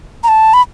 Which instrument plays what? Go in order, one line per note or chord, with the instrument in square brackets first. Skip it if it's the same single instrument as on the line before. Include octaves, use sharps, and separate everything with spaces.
[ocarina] A#5
A5
B5